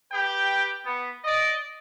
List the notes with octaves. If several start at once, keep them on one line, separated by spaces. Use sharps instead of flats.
G4 B4 G5
B3
D5 D#5